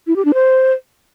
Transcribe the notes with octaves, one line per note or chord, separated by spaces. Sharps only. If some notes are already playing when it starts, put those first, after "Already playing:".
E4
G4
D4
C5